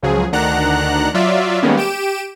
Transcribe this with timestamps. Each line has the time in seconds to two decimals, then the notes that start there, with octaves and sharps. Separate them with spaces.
0.02 C#2 C#3 F3 F#3 G#4
0.32 D2 D#3 D4 F#5 A#5 F#6
1.14 F#3 F4 D5 E5
1.62 D#3 G3 G#3 A#3 B3 C#4
1.77 G4 D7 E7